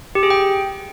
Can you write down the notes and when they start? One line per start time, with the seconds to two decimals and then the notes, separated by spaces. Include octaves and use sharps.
0.15 G4
0.23 G#4
0.30 G5